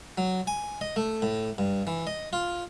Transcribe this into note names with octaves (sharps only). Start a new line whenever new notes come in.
F#3
G#5
D#5
A3
A2
G2
E3
D#5
F4